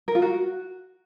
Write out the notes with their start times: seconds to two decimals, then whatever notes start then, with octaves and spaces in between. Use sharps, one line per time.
0.08 A#4
0.15 F4
0.22 F#4